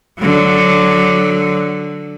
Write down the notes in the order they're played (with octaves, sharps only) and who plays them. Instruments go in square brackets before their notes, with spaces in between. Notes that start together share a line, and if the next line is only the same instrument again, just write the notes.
[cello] D3 F#3